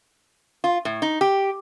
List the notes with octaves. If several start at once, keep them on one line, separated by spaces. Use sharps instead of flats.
F4
A2
D#4
G4